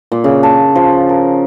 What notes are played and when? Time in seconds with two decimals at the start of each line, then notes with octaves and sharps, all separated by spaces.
0.12 A#2
0.24 C#3
0.43 A5
0.76 F3
1.09 A#4